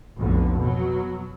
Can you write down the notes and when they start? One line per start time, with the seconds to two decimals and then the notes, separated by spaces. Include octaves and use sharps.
0.17 F1 B1 D3
0.58 B2 F#3